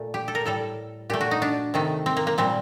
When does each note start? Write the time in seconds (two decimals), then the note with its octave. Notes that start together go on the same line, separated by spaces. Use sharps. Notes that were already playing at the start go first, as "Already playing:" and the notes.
Already playing: A#2 A3
0.14 G4
0.28 A4
0.35 A#4
0.46 A2 G3 A4
1.10 A#2 A3 G4
1.21 F#4
1.31 D#4
1.42 D4
1.74 C3 D#3 A3
2.06 C4
2.17 A#3
2.27 A#3
2.38 A#2 G3 C4